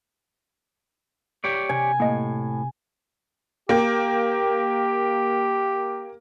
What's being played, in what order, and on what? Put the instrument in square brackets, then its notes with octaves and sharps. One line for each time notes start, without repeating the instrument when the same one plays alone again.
[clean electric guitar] G4 C#5 D5
[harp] C3 [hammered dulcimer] G#5
[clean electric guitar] A2 [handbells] A#3 D#5
[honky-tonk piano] A#3 G5 [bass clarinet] G4